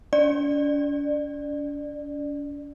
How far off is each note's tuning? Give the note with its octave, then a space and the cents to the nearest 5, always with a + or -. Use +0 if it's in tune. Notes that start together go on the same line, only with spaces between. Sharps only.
D4 -45 D5 +25